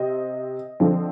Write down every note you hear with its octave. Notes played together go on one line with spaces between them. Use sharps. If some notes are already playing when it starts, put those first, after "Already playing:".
Already playing: C3 C4 D#5
D3 F3 C4